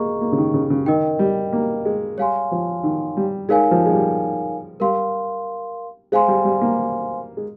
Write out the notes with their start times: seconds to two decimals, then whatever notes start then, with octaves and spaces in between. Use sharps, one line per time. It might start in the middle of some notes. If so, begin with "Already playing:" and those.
Already playing: A#3 G#4 D#5 A#5 C#6
0.21 A#3
0.32 C#3
0.38 D#3
0.54 C#3
0.70 C#3
0.86 D#3 A#4 D#5 G5
1.19 G3
1.53 A#3
1.85 G#3
2.18 G3 C#5 F5 G#5 C6
2.51 F3
2.83 D#3
3.17 G3
3.49 G#3 D#4 A#4 C#5 F5 G#5
3.71 F3
3.86 G#3
3.93 G3
4.80 G3 A#4 F5 C6
6.12 G#3 C5 F5 G#5 C6
6.28 G3
6.45 G3
6.61 A#3
7.37 G#3